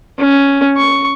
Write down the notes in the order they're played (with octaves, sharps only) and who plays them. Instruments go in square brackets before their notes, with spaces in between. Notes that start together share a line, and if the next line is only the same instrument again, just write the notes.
[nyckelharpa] C#4
C#6